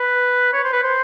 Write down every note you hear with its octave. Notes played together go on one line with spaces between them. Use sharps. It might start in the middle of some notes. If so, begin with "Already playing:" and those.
Already playing: B4
C#5
C5
B4
C5